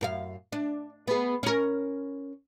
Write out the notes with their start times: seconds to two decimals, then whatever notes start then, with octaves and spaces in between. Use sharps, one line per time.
0.01 F#2 A#4 F5
0.52 D4
1.07 B3 G#4
1.43 C#4 A#4